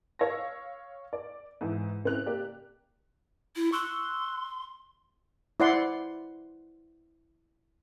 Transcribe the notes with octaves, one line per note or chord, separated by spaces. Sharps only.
C#5 F5 E6 A#6
D5
G#2 E3 E4
C#3 C4 E4 F#6 F7
A#3 G4 D5
E4
C6 C#6 E6 F#6
E4 C5 D5 F#5 C6